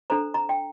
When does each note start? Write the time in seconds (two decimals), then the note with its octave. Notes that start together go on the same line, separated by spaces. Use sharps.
0.10 D4 A4 C5 A#5
0.34 A#5
0.49 G5